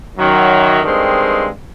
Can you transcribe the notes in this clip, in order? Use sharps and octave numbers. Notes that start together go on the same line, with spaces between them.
F#2 D#3 F#3
G2 D#3 G#3 C4